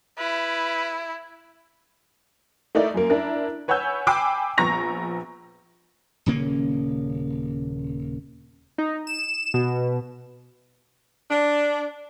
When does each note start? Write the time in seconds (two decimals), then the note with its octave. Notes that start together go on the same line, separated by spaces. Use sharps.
0.18 E4 B4
2.75 A3 D#4 E4 A#4 D5
2.94 F#2 A#3
3.10 D4 E4 A#4
3.68 B4 C#5 F#5 G#5 E6 G6
4.07 G5 G#5 B5 D6 E6 C7
4.58 A#1 B3 A#5 C#6 A#6 F7
6.26 D#1 C#3 A#3 C#4
8.78 D#4
9.07 E7
9.54 B2
11.30 D4